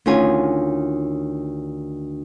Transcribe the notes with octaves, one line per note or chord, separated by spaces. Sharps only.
D2 D#3 C#4 F4 G#5